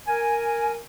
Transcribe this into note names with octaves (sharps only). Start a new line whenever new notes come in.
A#4 G#5